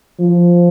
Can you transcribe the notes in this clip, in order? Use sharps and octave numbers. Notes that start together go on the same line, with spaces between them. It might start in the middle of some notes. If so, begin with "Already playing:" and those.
F3